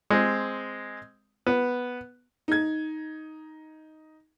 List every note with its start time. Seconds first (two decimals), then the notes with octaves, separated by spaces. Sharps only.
0.10 G#3 C4
1.46 B3
2.48 D#4 G#6